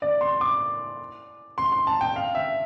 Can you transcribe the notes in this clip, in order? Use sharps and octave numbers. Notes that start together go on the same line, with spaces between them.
D5
C6
D6
C6
C6
A5
G5
F5
E5